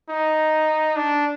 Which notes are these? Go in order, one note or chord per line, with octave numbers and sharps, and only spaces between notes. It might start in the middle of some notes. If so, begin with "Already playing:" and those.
D#4
D4